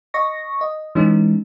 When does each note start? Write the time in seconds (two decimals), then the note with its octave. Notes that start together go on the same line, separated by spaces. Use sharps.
0.14 D#5 C#6 A#6
0.61 D#5
0.95 E3 G#3 C#4 D#4